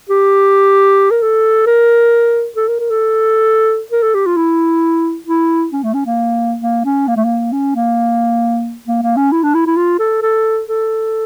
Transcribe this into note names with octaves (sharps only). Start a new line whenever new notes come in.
G4
A#4
A4
A#4
A4
A#4
A#4
A4
A#4
A4
G4
F4
E4
E4
C#4
A3
C#4
A#3
A#3
C#4
A#3
A3
A#3
C#4
A#3
A#3
A#3
C#4
E4
D4
E4
E4
F4
A4
A4
A4